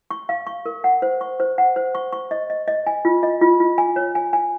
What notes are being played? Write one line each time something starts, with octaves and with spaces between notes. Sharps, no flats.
C#6
F5
C#6
A#4
F#5
C5
C#6
C5
F#5
C5
C#6
C#6
D#5
D#5
D#5
G#5
F4
D#5
F4
F4
G#5
C#5
G#5
G#5